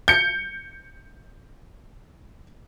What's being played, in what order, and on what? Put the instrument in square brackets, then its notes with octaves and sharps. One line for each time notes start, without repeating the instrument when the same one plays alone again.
[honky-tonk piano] G6 C#7